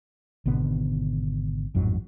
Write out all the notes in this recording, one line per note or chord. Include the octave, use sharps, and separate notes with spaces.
G#1 B2 D3 B3
A1 F2 G#2 F#3